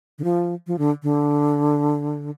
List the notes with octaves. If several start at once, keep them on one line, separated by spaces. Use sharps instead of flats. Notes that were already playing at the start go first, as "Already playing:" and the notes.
D3
F3
F3
D3
D3